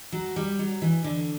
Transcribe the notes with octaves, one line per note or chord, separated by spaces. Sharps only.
F#3
G3
F#3
E3
D3